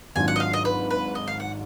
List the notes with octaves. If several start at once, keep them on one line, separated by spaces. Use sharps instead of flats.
G#1 G#2 F#3 D4 F4 G#5
F#5
D#5
F5
D#5
B4
B4
D#5
F5
F#5